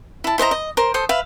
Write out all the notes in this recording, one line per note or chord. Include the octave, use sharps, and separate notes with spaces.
E4 A5
E4 C5 D#5 A#5
D#5
A#4 C5
A4 C5 D#6
B4 E5 F5